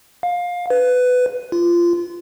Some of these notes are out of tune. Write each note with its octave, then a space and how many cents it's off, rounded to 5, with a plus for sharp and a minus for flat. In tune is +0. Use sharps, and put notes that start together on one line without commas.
F5 +20
B4 +15
F4 -20